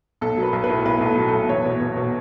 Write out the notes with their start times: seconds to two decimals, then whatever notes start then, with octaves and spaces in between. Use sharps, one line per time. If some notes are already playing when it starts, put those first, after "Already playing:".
0.21 B1 A4
0.37 F#3
0.43 B4
0.53 B1
0.64 B4
0.70 A2
0.85 B1 B4
1.01 B1
1.06 A4
1.17 F#3
1.28 B1 A4
1.49 E2 C#5
1.66 B2
1.81 B2
1.97 B2